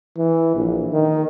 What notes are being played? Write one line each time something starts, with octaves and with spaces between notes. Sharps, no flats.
E3
A#1
D#3